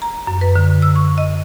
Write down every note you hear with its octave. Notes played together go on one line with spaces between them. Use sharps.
A#5
F#2
B4
D3
E6
C#6
D#5